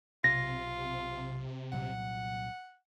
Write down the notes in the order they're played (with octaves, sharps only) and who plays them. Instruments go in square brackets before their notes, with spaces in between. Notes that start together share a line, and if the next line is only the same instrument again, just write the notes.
[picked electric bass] B1 [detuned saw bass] C3 [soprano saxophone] F4 [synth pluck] A#6
[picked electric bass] C2 A#2 F#3 [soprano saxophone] F#5